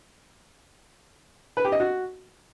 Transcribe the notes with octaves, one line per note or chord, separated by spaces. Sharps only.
B4
G4
D#5
F#4